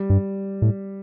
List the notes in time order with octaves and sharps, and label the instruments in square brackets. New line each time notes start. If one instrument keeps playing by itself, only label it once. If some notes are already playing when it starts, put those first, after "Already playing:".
Already playing: [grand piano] G3
[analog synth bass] G2
A2